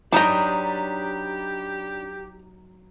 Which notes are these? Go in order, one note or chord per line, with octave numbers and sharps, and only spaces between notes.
F#3 D4 D#4 G4 B4 G5 A5 A#5